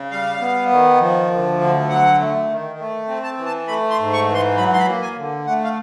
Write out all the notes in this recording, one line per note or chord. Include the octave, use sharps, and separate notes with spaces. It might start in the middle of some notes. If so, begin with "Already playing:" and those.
Already playing: C#3
G3 F5
B3
D#3
F3
D2
D3
F#3 F#5
A3
D#3
A3
C4
A5
E3
A5
A3 B5
C6
G#2
C#6
E3
C6
F#3 B5
C6
B5
A#3
G#5
D3
A3 F#5
F5